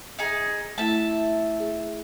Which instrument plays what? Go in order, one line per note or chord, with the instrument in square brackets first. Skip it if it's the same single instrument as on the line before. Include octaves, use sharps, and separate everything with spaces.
[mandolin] D#4 G#4
[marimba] A3 E4 [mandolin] E5 A5
[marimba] G#4